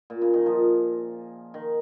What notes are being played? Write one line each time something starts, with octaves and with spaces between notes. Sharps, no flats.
A#2
C#3
D#3
F3
D#3